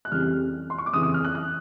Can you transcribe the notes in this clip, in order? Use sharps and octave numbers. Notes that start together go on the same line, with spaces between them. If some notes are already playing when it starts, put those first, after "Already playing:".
F#6
F2 C#3 E3 G3 F6
C6
C#6
D6
F2 C#3 E3 D#6
D#6
F6
F#6
F#6